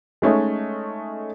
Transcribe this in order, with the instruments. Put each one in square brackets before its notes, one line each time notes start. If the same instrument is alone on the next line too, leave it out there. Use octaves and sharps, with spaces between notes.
[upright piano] G#3 A3 C#4 D#4